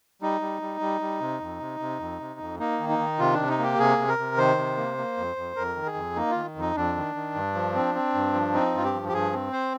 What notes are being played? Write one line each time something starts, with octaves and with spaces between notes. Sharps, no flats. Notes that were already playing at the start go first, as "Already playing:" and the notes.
G3 D#4
G3
G3
G3
G3
C3
F2
C3
C3
F2
C3
F2
A#3 D#4
D#3
D#4
D#3
C3 F4
D4
C3
D#4
A#3 G4
C3 G#4
C3
A#4
C3
D#3 C5
C3
A#3
A#3
F2
F2
F2 A#4
D#3
G#4
F2
A#3 D#4
D#3 F4
F2 D#4
F2 D4
D#3
D#3
G2
F3
C4
C4
G2
F3
C4 D#4
G2 F4
G4
F3
G4
G2 G#4
C4
C5